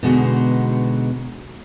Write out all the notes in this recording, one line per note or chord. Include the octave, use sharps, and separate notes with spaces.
B2 D3 G#3 B3 D#4 F#4